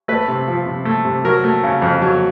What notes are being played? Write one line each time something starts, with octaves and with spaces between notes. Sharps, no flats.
A3 B4
C3
F3
C3
A3
C3
F#3 A#4
A3
C#3
F2
F#3